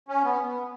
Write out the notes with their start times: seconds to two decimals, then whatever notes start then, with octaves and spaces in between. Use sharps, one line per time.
0.08 C#4
0.24 B3
0.45 B3